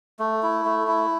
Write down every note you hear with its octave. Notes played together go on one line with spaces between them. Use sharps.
A3
E4
A3
E4